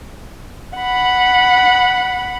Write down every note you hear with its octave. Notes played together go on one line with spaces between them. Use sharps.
F#5 B5